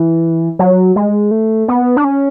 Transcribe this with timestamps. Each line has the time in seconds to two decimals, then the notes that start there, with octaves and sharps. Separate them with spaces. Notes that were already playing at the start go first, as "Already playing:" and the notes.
Already playing: E3
0.59 F#3
0.96 G#3
1.31 A3
1.68 B3
1.97 D4
2.04 C#4